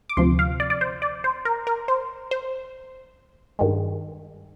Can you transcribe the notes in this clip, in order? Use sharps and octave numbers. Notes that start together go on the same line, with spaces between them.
D6
D2 C3 F3 C6
F5
D5
D5
C5
D5
C5
A#4
A#4
C5
C5
G2 D#3 G#3